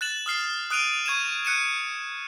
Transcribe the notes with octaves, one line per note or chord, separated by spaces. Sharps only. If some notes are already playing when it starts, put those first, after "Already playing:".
F#6 A6 E7 F#7
D#6 F6 C7 E7
D#6 F#6 D7 D#7 F7
C#6 G#6 D#7 E7
F#6 C#7 D#7 E7